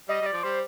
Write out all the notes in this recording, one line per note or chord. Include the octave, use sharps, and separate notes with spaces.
G3 D#5
G3 D5
F3
G3 C5